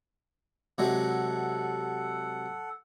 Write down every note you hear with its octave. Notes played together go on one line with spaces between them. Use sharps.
C3 F#3 G#3 A4 F#5